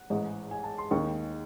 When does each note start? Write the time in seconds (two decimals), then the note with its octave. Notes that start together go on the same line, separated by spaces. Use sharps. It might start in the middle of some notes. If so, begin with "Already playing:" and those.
Already playing: F#5
0.10 A1 G#2 E3 G#3
0.51 G#5
0.64 A5
0.78 C6
0.91 D#2 D#3 G#3 C#6